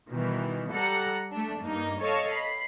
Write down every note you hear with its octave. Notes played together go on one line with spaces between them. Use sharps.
B2 D#3 E3 G3
G3 A4 F#5 A#5
A3 D4
G2 A#3 D#4
A4 C#5 D#5 F5 A5 C#6
B5 C7